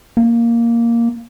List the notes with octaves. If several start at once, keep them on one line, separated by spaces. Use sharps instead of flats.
A#3